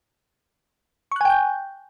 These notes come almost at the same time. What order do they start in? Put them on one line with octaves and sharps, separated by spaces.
C#6 F#6 G#5 G5 G6